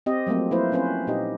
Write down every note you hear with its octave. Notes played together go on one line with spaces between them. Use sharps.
C4 G4 D#5
F3 F#3 A3 A#3 C4
F3 A#3 C4 E4 B4 C5
F3 C4 C#4 B4 C5
A#2 D#4 G4 D#5